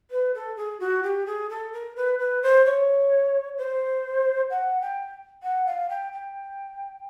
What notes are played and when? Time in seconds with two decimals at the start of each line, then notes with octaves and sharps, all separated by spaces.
0.11 B4
0.34 A4
0.57 G#4
0.80 F#4
1.03 G4
1.26 G#4
1.50 A4
1.73 A#4
1.96 B4
2.19 B4
2.43 C5
2.66 C#5
3.58 C5
4.50 F#5
4.81 G5
5.43 F#5
5.66 F5
5.90 G5
6.13 G5